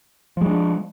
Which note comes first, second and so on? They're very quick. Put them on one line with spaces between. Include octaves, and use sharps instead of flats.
F3 G#3 D4